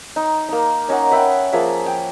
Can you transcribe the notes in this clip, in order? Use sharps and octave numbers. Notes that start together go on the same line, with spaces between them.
D#4
A#3 D#4
C#4 D#4 A#4 F#5
B4 E5 F#5 G5
F3 A#3 G#4 E5
G5